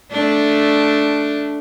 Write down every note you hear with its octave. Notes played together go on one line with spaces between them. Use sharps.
A3 D4